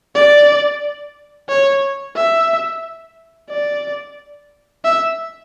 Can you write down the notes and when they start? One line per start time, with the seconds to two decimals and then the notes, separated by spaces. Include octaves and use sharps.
0.15 D5
1.49 C#5
2.16 E5
3.50 D5
4.84 E5